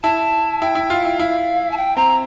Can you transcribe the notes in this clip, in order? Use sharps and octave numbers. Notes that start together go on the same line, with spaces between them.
E4 A5
E4 G5
E4
F4
E4
E4 F5
A5
G5
C4 A#5